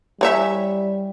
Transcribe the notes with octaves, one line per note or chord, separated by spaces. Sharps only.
E3 G3 C#5 E5